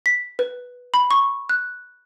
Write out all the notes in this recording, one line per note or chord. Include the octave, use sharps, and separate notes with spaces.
B6
B4
B5
C#6
F#6